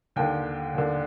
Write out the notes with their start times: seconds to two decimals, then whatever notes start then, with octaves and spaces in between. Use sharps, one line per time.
0.16 D#2 D3 G5
0.74 D#2 D3